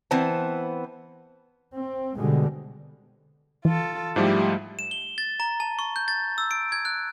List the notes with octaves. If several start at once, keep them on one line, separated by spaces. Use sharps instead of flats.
E3 B3 C4 C5 A5
C4
B2 D3 G3 G#3
E3 F4 A4
G#2 F3 G3 A3 E4 G4
E7
G7
A6
A#5
A5
C#6
G6
A6
E6
D7
G#6
F#6